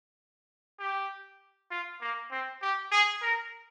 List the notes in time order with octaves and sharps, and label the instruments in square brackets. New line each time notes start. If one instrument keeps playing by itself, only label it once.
[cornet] G4
F4
A#3
C4
G4
G#4
A#4